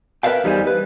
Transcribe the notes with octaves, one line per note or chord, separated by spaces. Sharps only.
A#4 B4 D5 E5 F5 G5
E2 G3 D#4 C5 G#5
B4